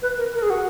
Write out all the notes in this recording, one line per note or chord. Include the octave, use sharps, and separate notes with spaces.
B4
A#4
A#4
G#4
F#4